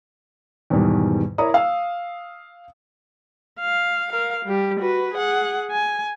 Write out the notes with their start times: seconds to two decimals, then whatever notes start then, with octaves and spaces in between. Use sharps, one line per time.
0.70 E2 G#2 B2 D#3 G3
1.38 E4 A#4 C#5 D5 A#5 D#6
1.54 F5 E6
3.59 F5
4.13 A#4 F5
4.46 G3 G4
4.80 F#4 B4
5.15 G#4 F#5
5.71 G#5